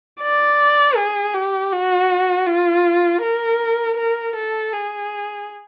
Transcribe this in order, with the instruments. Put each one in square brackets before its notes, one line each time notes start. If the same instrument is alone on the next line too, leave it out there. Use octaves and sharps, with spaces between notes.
[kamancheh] D5
G#4
G4
F#4
F4
A#4
A#4
A4
G#4